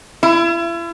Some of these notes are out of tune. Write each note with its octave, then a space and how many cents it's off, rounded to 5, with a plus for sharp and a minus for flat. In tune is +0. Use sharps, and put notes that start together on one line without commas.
E4 +40